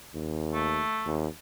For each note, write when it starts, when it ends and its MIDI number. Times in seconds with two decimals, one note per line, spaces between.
0.14 0.82 39
0.53 1.19 57
1.06 1.27 39